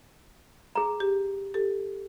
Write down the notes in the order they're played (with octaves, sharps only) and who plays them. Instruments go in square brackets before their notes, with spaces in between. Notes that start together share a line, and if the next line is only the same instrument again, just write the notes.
[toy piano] G#4 A#5
[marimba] G4
G4 A4